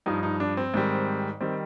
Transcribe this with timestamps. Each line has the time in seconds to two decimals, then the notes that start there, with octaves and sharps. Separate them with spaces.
0.06 G2 F3 D#4
0.23 D#4
0.40 D4
0.57 C4
0.74 G#2 D#3 G3
1.41 D#3 G3 C4